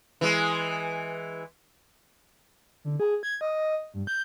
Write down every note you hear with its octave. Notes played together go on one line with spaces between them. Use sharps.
E3 G#3
D3
G#4
G#6
D#5
G2
G6